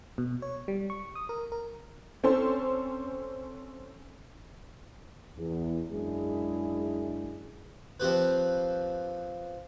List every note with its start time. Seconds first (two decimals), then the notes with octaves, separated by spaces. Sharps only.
0.18 B2
0.42 C#5
0.68 G3
0.90 C#6
1.15 D#6
1.29 A#4
1.52 A#4
2.24 C4 C#4 A4 C5
5.39 E2
5.91 F#2 G#3 D4 E4 G#4
8.00 F3 C4 G4 B4